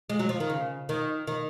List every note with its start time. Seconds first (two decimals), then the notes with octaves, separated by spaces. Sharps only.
0.10 G#3
0.19 F#3
0.29 F3
0.40 D#3
0.50 C#3
0.89 D#3
1.27 D#3